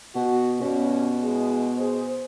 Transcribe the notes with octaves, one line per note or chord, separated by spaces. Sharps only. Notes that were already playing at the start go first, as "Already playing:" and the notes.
B2 F#4
G2 B2 C#4
G#3 E4 G#4
G#4 C5